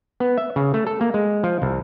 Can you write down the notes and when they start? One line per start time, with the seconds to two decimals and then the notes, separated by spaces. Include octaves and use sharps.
0.20 B3
0.38 E5
0.56 C#3
0.74 A3
0.87 A4
1.01 A#3
1.14 G#3
1.43 F3
1.62 C2